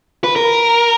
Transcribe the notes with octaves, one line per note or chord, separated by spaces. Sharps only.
B4
A#4